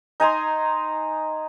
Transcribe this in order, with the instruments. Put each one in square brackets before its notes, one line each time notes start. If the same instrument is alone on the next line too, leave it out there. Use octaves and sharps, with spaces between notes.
[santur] D#4 G#5 A#5 C6